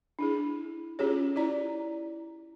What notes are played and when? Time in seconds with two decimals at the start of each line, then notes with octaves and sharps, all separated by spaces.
0.19 D4 E4 G#4
0.99 C#4 F4 G4 G#4 C#5
1.36 E4 D5 A#5